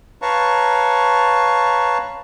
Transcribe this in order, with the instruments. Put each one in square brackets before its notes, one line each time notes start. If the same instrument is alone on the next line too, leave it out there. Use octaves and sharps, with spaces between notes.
[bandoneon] B4 C#5 F5 A5 A#5 C#6